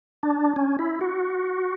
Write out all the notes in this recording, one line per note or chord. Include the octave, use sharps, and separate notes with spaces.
D4
C#4
E4
F#4